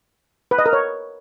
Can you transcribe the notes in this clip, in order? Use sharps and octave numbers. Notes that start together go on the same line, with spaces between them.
B4
D#5
A#4
C#5